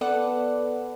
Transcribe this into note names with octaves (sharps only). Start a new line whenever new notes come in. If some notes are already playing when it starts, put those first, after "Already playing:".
B3 A4 B4 D5 F#5